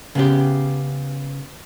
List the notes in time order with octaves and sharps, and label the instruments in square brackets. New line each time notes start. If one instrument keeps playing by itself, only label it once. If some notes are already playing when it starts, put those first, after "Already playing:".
[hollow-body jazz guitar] C#3 B3 G4